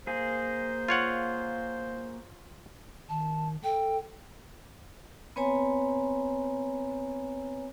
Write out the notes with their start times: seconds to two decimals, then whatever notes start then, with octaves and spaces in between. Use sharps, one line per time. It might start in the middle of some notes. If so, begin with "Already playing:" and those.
0.07 A#3 G#4 C5
0.88 F4 C#5 F#5
3.09 D#3 A5
3.64 A4 G5
5.36 B3 C4 B4 C#5 G#5 A#5